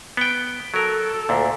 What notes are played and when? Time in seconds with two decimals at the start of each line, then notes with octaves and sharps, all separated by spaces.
0.17 B3 G5
0.74 F#3 A4 A#4
1.29 D2 A#2